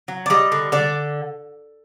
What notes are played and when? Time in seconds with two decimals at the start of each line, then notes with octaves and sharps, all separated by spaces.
0.08 F#3
0.26 D5
0.30 G3 D#5
0.52 D3
0.72 D3 D5